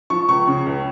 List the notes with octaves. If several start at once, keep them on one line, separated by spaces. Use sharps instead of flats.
F3 C#6
C#2 C#6
C#3
C#2